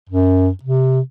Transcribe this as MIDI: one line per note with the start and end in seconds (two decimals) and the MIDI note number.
0.09 0.49 42
0.63 1.00 48